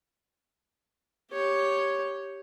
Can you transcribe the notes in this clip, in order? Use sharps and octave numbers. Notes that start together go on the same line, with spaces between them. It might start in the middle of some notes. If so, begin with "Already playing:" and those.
G4 C#5